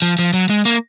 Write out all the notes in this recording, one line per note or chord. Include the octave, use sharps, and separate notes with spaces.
F3
F3
F#3
G#3
A#3